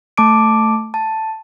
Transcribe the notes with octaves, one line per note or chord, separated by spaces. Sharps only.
A3 A5 D6 D7
A5